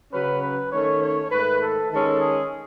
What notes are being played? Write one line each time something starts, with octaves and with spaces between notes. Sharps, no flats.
C#3 F#3 C#4 B4
B4
D#3 A3 C#4 C#5
C#5
G#2 D#3 A3 B4
A4
D#3 G#3 C#4 A4
G#4